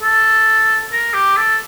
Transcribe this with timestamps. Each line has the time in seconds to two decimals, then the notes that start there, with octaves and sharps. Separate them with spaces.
0.02 A4
0.92 A#4
1.14 G4
1.36 A4